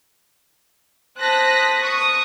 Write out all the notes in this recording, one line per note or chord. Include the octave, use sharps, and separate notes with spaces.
C5 A5 D#6 F#6 A#6 B6
C#6 D#6